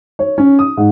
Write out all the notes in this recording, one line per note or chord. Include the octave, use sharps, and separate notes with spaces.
C#5
C#4
D#6
G#2